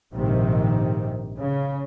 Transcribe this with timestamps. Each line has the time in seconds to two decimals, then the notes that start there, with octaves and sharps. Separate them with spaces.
0.13 A#1 G#2 C3 D#3
1.38 C#3